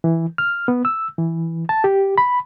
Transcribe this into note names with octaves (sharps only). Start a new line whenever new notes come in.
E3
F6
B3
E6
E3
A5
G4
B5